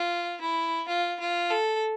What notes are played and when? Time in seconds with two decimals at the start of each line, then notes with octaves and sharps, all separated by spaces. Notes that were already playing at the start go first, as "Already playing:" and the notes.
Already playing: F4
0.41 E4
0.88 F4
1.20 F4
1.51 A4